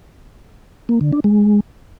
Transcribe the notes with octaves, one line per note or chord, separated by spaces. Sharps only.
A#3
D3
D4
G#3